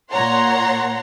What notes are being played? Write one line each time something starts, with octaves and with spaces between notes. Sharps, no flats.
A#2 C#5 F#5 A#5 C6